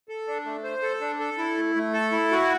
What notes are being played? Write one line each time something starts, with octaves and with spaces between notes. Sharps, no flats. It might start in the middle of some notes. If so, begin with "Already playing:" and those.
A4
D4
A3
C5
A4
D4
A4
E4
A3
A3
A4
E4
F#4